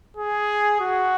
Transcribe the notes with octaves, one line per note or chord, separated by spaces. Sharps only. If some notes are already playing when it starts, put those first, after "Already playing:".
G#4
F#4